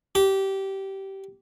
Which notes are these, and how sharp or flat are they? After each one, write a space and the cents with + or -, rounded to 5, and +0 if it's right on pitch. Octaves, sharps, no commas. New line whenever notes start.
G4 -20